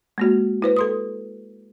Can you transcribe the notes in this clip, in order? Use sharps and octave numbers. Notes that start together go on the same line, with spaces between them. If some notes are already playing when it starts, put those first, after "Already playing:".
G#3 A#3 F#4
E4 B4 C5
A4 C6 D#6